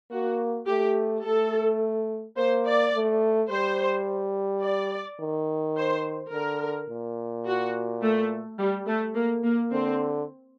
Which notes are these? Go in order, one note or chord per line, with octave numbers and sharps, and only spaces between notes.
A#3 F#4
A3 G4
A3 A4
A#3 C5
D5
A3
G3 C5
D5
D#3
C5
D3 A#4
A#2
F#4
A3
G3
A3
A#3
A#3
D3 C4